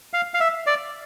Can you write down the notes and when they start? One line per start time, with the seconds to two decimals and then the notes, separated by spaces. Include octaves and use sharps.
0.13 F5
0.34 F5
0.40 E5
0.67 D5